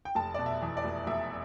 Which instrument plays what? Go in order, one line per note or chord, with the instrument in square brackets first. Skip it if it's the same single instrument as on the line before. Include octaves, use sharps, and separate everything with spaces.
[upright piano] G5
F1 A5
B2 D5
E5
E2
D5
F1
F1 E5